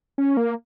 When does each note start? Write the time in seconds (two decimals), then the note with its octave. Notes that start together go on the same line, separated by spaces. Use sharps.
0.18 C#4
0.37 A#3